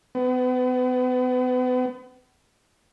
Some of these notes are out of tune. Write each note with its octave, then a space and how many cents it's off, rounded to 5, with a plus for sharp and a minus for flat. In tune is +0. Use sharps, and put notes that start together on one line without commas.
B3 +35